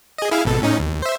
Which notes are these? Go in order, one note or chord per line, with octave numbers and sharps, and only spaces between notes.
G#4 D#5
E4 G#4 F5
G#1 B2 A4
A2 C#4 D#4
D#2
C5 E5